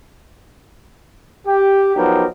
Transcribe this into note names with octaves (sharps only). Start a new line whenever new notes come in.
G4
F3 F#3 B3 D#4 G4 A#4